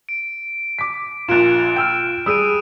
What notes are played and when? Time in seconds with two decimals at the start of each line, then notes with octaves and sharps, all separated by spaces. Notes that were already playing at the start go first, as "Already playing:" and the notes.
0.09 D7
0.79 D6 B6
1.28 A#1 A#2 F4 F#6 D7 E7
1.76 G5 E6 F6
2.26 G3 G#4 D#6 E6 D7 D#7